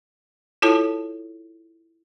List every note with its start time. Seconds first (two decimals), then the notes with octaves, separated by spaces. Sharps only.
0.62 E4 F4 A4 C#5 A5